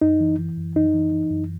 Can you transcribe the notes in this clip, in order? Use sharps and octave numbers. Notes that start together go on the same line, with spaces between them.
F#2 D#4
E3
E3
F#2
F#2 D#4
E3
E3
F#2